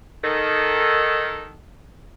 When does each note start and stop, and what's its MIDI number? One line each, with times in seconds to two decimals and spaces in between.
0.23 1.52 51
0.23 1.52 69